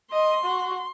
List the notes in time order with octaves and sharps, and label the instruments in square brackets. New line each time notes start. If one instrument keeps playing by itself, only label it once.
[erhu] D#5 [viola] C6
[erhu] F#4